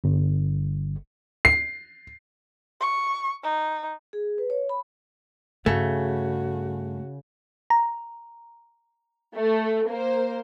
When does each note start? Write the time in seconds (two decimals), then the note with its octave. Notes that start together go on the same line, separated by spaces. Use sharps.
0.04 G1
1.45 C7
2.81 C#6
3.43 D#4
4.13 G#4
4.38 B4
4.50 C#5
4.69 B5
5.66 G2 C#3 A3 F#4
7.70 A#5
9.34 A3
9.88 A#3 C5